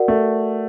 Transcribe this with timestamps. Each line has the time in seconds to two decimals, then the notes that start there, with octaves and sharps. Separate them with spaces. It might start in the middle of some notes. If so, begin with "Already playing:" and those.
Already playing: F#4 A#4 D5 F#5
0.08 A3